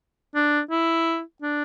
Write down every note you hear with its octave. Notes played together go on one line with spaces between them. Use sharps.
D4
E4
D4